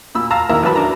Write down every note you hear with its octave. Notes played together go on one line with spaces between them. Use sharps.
A#2 B5 E6
F5 A5 A#5 E6
D#3 A#3 E4 E5 A#5 E6
A1 E3 F#3 A5 B5
D4 A#5